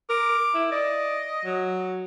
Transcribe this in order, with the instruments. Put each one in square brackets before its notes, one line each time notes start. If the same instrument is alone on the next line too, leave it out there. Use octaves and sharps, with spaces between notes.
[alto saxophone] A#4 [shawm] D6
[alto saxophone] E4
[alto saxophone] D5 [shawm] D#5
[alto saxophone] F#3